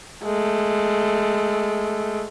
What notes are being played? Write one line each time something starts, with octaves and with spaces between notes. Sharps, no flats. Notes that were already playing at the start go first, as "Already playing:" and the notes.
G#3 A3